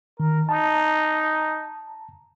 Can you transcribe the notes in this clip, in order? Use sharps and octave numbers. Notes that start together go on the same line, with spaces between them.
D#3 A#4
D#4 A5 A#5